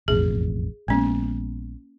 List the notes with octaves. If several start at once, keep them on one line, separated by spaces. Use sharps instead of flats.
E1 A1 F2 G#4
A#1 G#3 A#3 B3 C#4